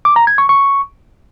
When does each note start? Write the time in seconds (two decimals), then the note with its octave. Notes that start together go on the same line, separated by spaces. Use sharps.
0.05 D6
0.16 A#5
0.27 G#6
0.38 C#6
0.49 C#6